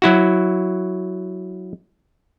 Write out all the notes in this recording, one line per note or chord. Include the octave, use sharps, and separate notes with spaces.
F#3 E4 F#4